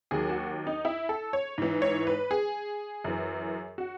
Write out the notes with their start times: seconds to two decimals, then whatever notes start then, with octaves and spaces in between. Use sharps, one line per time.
0.11 D#2 D#3 F#3 G#4
0.30 F#4
0.67 D#4
0.85 E4
1.09 A4
1.33 C#5
1.58 G#2 E3
1.82 C#5
2.07 B4
2.31 G#4
3.04 F#2 E3
3.78 F#4